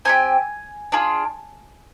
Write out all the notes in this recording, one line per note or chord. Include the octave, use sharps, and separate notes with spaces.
C4 D#4 G4 G#5
D4 F4 G#4